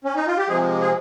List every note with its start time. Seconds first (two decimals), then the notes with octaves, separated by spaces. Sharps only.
0.04 C#4
0.15 D#4
0.27 F4
0.37 G4
0.48 C3 F3 G#3 G#4
0.81 G#4